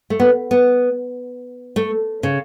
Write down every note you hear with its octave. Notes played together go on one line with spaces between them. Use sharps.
A3
B3
B3
A3
C#3